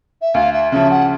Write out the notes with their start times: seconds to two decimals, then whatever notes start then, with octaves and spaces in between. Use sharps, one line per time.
0.22 E5
0.34 D2 F5
0.53 E5
0.72 C#3 F3 E5
0.90 F#5